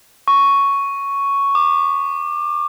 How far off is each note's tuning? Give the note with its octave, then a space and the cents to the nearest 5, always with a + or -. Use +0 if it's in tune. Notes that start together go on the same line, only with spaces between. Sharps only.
C#6 +5
D6 +25